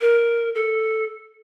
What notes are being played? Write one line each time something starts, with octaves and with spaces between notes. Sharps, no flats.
A#4
A4